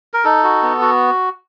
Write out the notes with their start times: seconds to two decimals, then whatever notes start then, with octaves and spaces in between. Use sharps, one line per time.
0.14 A#4
0.24 D#4 A4
0.44 F#4
0.62 B3
0.81 F#4